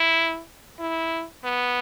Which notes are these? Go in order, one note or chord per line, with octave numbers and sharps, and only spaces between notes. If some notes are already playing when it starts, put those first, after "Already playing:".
Already playing: E4
E4
B3